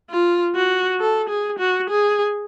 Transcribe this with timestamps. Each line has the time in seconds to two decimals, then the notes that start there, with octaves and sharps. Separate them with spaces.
0.10 F4
0.55 F#4
1.00 A4
1.29 G#4
1.59 F#4
1.90 G#4